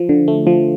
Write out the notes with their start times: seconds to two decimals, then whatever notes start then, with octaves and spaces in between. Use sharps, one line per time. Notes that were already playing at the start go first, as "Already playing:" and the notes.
Already playing: F3
0.09 D3
0.28 A3
0.47 F3